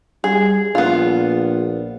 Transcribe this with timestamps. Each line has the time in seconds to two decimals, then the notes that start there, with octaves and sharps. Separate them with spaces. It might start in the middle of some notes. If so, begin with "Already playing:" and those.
0.24 G3 G#4
0.75 A#1 B3 F4